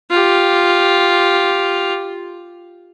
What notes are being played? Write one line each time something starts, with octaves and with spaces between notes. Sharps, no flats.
F4 G4